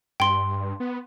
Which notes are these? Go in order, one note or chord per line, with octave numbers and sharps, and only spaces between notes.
G2 G5 C6
B3